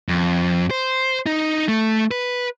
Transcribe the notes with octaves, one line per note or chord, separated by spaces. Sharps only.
F2
C5
D#4
A3
B4